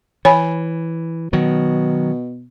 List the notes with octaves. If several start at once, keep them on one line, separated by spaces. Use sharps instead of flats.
E3 C#5 G#5 B5
B2 D#3 F#3